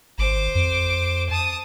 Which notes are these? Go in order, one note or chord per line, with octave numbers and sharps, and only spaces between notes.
G#1 C5 D6
F2
A5 D#6